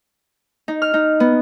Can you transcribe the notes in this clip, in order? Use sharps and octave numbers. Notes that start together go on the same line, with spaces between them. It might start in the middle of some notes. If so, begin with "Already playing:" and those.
D#4
F6
D#4
B3